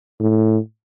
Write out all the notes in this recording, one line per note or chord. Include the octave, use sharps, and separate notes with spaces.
A2